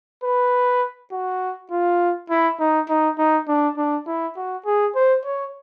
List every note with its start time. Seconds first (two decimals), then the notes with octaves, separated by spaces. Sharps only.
0.24 B4
1.12 F#4
1.71 F4
2.30 E4
2.60 D#4
2.89 D#4
3.18 D#4
3.48 D4
3.77 D4
4.07 E4
4.37 F#4
4.66 G#4
4.95 C5
5.25 C#5